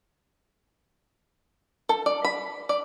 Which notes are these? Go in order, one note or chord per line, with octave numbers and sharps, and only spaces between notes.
A4
D5
B5
D5